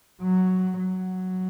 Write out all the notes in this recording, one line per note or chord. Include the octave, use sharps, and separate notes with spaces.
F#3
F#3